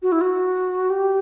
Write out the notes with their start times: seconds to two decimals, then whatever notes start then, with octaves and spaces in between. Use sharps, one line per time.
0.03 F#4
0.12 E4
0.21 F#4
0.90 G4